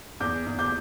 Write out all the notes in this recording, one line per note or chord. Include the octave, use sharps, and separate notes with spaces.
E2 D6 G6
E2
D6 G6